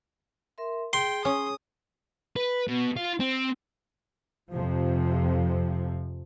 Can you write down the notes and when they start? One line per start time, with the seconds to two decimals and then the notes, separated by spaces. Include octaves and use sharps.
0.58 A#4 E5 C6
0.93 G#4 G5 C6
1.25 C#4 D#6
2.36 B4
2.68 B2
2.96 F4
3.20 C4
4.51 F2 C3 F3